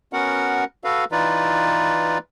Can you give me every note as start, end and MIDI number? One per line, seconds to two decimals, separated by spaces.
0.13 0.64 59
0.13 0.64 61
0.13 0.64 66
0.13 0.64 70
0.13 0.64 78
0.84 1.05 66
0.84 1.05 69
0.84 1.05 71
0.84 1.05 77
1.12 2.18 52
1.12 2.18 63
1.12 2.18 65
1.12 2.18 71
1.12 2.18 74